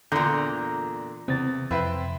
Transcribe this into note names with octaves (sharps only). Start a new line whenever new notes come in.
E2 A#2 D3 A#5 G6
E2 C3 C4 A6
F2 C4 E4 B4 E5